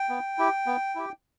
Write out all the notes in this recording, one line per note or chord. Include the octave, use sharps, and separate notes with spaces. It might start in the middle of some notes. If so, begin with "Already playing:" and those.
Already playing: G5
B3
E4 G4
B3
E4 G4